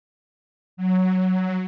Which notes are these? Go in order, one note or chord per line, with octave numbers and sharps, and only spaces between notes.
F#3